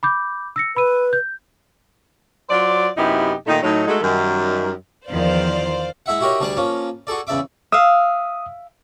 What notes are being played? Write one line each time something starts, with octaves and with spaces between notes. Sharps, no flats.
B5 D6 G6
E6 A#6 C#7
B4 B5 E6 D#7
G6
F#3 F4 C5 D5
F#2 C3 B3 D#4 E4 G4
A#2 D#3 A3 D#4
A2 F#3 D#4
G#3 A3 D#4 F#4 G#4 A4
F#2 D#3 G3
E2 D#3 F3 C5 D5 F5
G#3 E4 E5 F#5
E4 F#4 G4 A#4 C#5 D#5
D2 G3 D4 G#4 D5 A5
F3 A#3 C#4
F#4 G#4 A4 D5
E2 C#3 D5 E5 D6
E5 F5 D#6